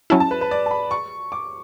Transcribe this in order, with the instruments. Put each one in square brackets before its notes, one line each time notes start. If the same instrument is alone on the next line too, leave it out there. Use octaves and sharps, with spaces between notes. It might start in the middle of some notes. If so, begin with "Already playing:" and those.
[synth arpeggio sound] F#3 C#4 E4 [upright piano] A5
[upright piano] A5
B4
B4
D5
A5
B5
C#6
D6